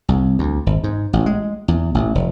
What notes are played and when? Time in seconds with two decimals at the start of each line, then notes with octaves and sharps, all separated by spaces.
0.09 C2
0.39 D2
0.66 G#1
0.84 G#2
1.13 A1
1.26 G#3
1.68 E2
1.95 A1
2.15 F1